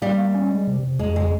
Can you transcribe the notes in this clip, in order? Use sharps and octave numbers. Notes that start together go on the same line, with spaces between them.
G3 A#3
A#3
C#4
G#3
C3
C3
F2 G#3
C#3 G#3